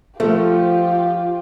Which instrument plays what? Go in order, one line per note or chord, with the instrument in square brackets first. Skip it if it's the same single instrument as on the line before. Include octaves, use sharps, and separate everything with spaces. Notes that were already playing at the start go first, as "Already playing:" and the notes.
[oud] F3 [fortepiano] A3 [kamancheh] F4 G4